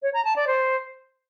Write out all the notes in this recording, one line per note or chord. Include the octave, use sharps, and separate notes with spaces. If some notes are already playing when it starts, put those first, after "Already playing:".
C#5
A#5
A5
D5
C5